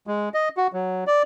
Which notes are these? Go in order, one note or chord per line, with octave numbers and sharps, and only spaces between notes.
G#3
D#5
F#4
F#3
D5